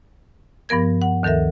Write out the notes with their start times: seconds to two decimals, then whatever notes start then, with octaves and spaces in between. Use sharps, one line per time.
0.69 G2 F3 B3 A#4 G#6
1.02 F#5
1.23 D2 D#3 A4 A#4 E5